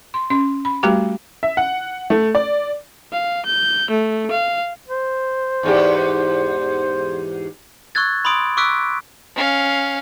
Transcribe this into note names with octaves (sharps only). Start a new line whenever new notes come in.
C6
C#4 C6
B5
G3 A3 F#4 G4 A#5 D6
E5
F#5
A3
D5
F5
G6
A3
F5
C5
E2 G#2 G4
C#6 E6 F#6 G#6 A6
B5 C6 D#6 D7
C#6 D6 E6 F#6 B6 D7
C#4 F5